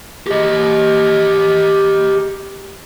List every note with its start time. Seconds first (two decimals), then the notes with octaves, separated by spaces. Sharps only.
0.27 G4 D#5